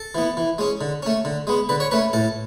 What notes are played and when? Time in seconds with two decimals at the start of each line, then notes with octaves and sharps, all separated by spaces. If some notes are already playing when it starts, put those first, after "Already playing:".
Already playing: A4
0.15 E3 B3
0.37 E3
0.58 G#3 C#4
0.81 D3
1.03 A3 C#4
1.25 D3
1.47 G#3 B3
1.69 D3 B4
1.80 C#5
1.91 A3 C#4 B4
2.13 A2 A4